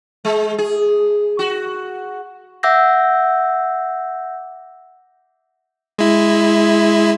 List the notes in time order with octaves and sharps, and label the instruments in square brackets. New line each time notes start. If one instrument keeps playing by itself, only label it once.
[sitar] G#3
G#4
F#4
[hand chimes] E5 F#5 D6 E6 G6 A#6
[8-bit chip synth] G#3 E4